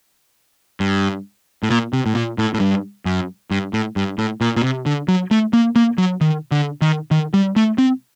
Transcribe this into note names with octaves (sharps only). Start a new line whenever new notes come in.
G2
A2
A#2
C3
A2
A#2
A2
A2
G2
F#2
G2
A2
G2
A2
A#2
A#2
C3
D3
F#3
A3
A#3
A#3
F#3
D#3
D3
D#3
D#3
G3
A3
C4